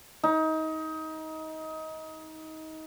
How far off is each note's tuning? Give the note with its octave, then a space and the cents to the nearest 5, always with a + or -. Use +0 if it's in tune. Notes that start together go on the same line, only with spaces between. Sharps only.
D#4 +25